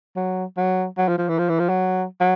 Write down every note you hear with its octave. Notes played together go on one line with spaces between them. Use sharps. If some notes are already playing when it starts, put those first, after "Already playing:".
F#3
F#3
F#3
F3
F3
E3
F3
E3
F3
F#3
F#3